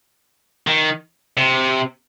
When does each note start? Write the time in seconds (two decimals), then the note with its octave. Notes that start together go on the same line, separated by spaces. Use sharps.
0.67 D#3
1.37 C3